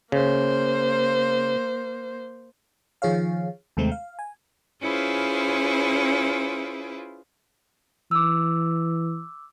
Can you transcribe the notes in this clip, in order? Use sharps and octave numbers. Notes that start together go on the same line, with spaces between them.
C#3 A#3 C5
D#3 F3 G#4 C#5 F5
D#2 C3 G#3 A3 C4
F5
G#5
C#4 E4 F4 G#4 B4 C5
E3 D6 E6